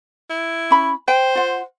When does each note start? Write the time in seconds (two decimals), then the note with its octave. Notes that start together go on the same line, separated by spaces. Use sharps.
0.30 E4
0.71 C#4 B5
1.08 C5 G5
1.35 F4 F#5